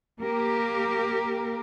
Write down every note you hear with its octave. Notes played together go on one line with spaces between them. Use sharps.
A#3 G4 A#4